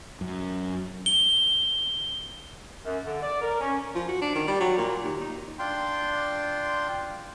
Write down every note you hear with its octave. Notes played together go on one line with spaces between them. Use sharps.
F#2
G7
F#2
D3
D5
A#4
C#4
F3
F#4
D4
D#3
G3
F#3
A#2
D#2
D#4
D4 F4 G5 C6